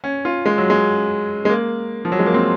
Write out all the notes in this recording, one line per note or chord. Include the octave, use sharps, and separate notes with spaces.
C#4
F4
G#3
F#3
G#3
G#3
A#3
F3
F#3
G#3
A#3
C4